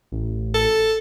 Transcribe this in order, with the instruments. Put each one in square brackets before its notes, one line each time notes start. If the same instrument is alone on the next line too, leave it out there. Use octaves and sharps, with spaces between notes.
[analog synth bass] A1
[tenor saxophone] A4